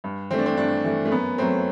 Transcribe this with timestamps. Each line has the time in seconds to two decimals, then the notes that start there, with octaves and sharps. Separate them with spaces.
0.04 G2
0.31 E3 C4
0.34 A3 D4
0.46 C4
0.57 G2 D4
0.85 E3 A3
1.06 A3
1.11 F#2 B3
1.38 F#3 A3 C4